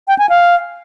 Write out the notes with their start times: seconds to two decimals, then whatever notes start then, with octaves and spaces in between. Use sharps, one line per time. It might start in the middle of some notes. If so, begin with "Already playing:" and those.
0.08 G5
0.19 G#5
0.29 F5